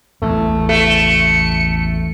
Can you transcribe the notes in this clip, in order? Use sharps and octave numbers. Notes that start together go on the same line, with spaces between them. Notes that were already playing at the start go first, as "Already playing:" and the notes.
A1 E2 A3
A3 C#7